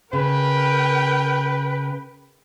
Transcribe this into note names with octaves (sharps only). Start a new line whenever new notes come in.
C#3 A#4 B4 G5